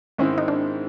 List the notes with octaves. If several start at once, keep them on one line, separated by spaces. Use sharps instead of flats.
G#2 D#3 G#3 C4 C#4 E4
D#4
D4